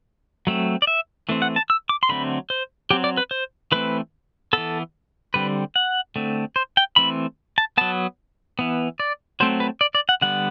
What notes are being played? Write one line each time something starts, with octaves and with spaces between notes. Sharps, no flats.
F#3 A3 C4
D5
E5
E3 A3 C4
F#5
A5
E6
D6
C6
D3 F#3 A3 C4 B5
C5
F#3 C4 G4
D5
B4
C5
E3 A3 C4 B4
E3 B3 A4
D3 G3 C4 B4
F#5
D3 A3 C4
C5
G5
E3 A3 C4 B5
A5
F#3 B3 A5
E3 B3
D5
F#3 A3 C4 C5
B4
D5
D5
F#5
D3 G3 B3 F#5